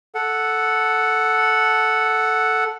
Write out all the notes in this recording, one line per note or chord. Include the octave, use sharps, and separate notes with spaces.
A4 F#5